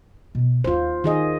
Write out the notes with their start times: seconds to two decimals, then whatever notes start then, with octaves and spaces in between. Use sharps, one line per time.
0.35 B2
0.64 D#2 D#4 F4 C5
1.04 D#3 G#4 D#5